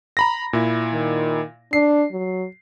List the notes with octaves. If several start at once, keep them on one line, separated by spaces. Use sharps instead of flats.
A#5 B5 A#6
A#2 E4
D#3
D4 C7
F#3